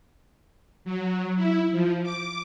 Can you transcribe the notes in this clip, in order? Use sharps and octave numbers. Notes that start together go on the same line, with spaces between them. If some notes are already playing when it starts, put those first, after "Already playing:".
F#3
E4
F3
D6